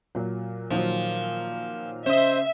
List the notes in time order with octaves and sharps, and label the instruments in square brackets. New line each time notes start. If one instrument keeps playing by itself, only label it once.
[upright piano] A#2 F#3
[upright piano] A#2 D#3 F#3 [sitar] F3
[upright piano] C#3 [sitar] C5 D#5 [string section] E5